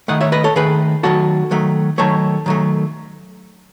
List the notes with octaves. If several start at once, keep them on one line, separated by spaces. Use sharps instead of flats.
D#3 A3 D#5 F#5
C#5 E5
B4 D#5
A4 C#5
D#3 A3 G#4 B4
D#3 F#3 A3 F#4 A4
D#3 F#3 A3
D#3 F#3 A3 A4 C#5
D#3 F#3 A3